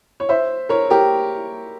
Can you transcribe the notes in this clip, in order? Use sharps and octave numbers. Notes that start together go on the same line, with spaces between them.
C#5
C5 E5
A#4 C#5
G4 A#4